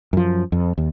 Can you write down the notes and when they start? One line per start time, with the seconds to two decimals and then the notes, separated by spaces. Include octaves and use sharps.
0.13 F#2 F3
0.52 F2
0.78 D#2